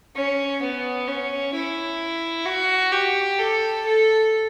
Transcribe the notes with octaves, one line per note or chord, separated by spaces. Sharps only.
C#4
B3
C#4
E4
F#4
G4
A4
A4